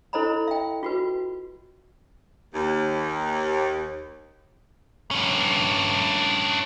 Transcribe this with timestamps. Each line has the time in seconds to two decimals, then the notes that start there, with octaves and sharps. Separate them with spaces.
0.13 E4 A4 C5 D#5 A#5 B5
0.48 E5 G5
0.83 F4 F#4 B4
2.53 D#2
5.11 G2 C#4